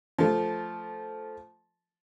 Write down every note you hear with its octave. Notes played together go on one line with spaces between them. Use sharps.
F3 A3